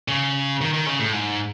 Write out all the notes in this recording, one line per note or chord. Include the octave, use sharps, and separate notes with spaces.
C#3
D#3
D#3
C#3
A2
G#2